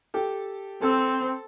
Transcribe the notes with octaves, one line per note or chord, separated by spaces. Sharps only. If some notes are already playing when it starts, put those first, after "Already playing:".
G4 A4
C4 A4 E6